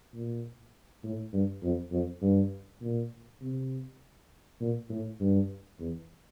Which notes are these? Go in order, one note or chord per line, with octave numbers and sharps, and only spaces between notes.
A#2
A2
G2
F2
F2
G2
A#2
C3
A#2
A2
G2
E2